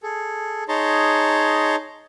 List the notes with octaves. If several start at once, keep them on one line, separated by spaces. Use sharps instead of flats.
G#4 A4
D#4 G#4 C#5 A5 A#5 C6